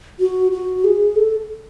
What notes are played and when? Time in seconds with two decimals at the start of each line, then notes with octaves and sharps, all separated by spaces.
0.20 F#4
0.52 F#4
0.84 G#4
1.16 A4